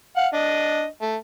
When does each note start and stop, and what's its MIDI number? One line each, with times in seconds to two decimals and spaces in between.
0.16 0.27 77
0.16 0.27 78
0.34 0.86 62
0.34 0.86 75
1.01 1.16 57